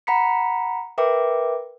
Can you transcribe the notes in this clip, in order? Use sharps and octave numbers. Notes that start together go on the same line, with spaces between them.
F#5 A#5 B5 B6 C#7
A#4 B4 E5 G5 D6